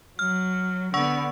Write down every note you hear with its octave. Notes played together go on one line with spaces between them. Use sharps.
F#3 F6
D3 B3 F#5 C#6 E6